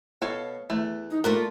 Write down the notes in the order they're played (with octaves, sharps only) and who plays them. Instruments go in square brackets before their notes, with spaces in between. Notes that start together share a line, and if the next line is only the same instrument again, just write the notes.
[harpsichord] B2 [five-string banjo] A4 C#5 F5
[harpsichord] E2 [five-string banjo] A3
[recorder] D#4
[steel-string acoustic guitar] A3 A#3 D4 [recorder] F4 [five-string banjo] A#4 [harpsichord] B4